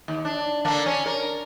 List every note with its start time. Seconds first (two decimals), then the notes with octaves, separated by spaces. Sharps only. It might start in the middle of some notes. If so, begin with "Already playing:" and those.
0.08 D#2
0.25 D4
0.65 D3 A#3 D4
0.86 C#4
1.06 A#4